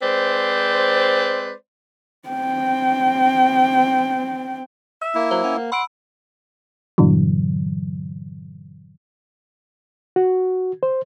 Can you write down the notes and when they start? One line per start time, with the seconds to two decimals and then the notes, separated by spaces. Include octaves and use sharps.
0.03 G#3 C4 B4 C5 D5
2.28 C4 G5
5.02 E5 E6
5.15 A#3 E4
5.31 F#3 C5
5.44 C#4 F#5
5.57 A#3
5.72 F#5 B5 C6 E6 D7
6.98 G2 A#2 D3 E3 F#3
10.16 F#4
10.83 C5